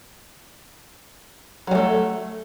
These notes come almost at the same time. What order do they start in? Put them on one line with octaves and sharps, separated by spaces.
F#3 G3 A3